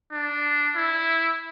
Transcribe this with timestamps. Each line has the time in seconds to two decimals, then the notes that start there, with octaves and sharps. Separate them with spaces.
0.12 D4
0.76 E4